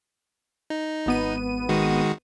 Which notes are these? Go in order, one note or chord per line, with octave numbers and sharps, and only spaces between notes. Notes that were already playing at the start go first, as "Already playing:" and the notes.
D#4
G#1 B3 D#7
D#3 G#3 F#4